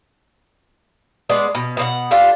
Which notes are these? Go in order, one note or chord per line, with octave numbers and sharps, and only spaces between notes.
G#3 B3 D4 D5
B2
B2 F#4 F#5
D4 F4 G4 A4